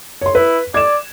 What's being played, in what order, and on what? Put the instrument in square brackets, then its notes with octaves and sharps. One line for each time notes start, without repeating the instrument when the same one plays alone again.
[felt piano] C#5 C6
[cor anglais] E4 [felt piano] B4
[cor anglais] D5 [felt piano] G#6 E7